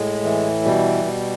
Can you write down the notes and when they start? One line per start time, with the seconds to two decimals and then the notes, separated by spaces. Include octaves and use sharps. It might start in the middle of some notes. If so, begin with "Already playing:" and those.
Already playing: A2 G#3
0.24 E3
0.65 B2 G3
1.05 B2